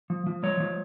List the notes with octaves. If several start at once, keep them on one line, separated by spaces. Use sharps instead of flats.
F3
F3
G#3 C#5
F3